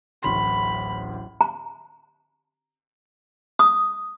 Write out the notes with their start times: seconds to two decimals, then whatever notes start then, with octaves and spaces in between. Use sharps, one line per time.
0.23 D1 A1 B5 C6
1.41 A#5
3.59 D#6